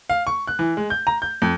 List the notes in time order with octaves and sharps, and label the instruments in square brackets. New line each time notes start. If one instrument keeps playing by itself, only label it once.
[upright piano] F5
C#6
F#6
E3
G#3
G6
A#5
G6
F2